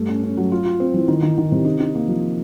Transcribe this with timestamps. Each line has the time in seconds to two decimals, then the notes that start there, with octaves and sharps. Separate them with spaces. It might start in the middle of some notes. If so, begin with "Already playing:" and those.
Already playing: G2 A3
0.09 C#4
0.23 C#4
0.37 F#3
0.52 F4
0.65 F4
0.80 C4
0.94 E3
1.08 D#3
1.22 D#3
1.38 D#3
1.52 C3
1.65 D#4
1.80 D#4
1.95 A#3
2.08 F3